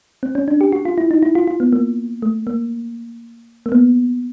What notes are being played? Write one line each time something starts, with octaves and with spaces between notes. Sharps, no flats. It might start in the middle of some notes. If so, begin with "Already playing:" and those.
C4
C#4
D4
G4
F#4
F4
E4
D#4
E4
F4
F4
B3
A#3
A3
A#3
A#3
B3